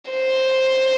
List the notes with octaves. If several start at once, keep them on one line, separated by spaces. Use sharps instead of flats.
C5